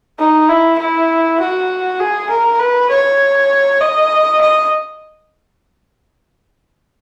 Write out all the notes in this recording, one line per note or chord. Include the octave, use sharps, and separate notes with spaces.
D#4
E4
E4
F#4
G#4
A#4
B4
C#5
D#5
D#5